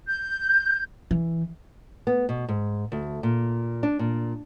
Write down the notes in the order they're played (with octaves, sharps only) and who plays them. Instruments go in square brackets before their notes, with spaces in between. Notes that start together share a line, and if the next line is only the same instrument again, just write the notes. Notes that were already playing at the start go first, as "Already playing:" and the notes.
[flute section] G6
[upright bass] E3
[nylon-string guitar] B3
B2
G#2
D2
A#2
D4
A#2